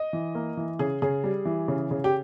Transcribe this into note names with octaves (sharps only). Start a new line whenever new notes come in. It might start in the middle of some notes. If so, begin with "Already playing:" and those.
Already playing: D#5
E3
A#3
E3
C#3 G#4
C#3 G#4
G3
E3
C#3
C#3
G4